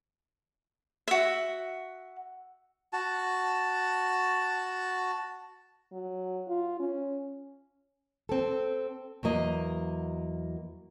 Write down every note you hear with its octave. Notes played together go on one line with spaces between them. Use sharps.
F#4 E5
F#4 A5
F#3
F4
C#4
C4 A4
E2 F#3 A#3 D#5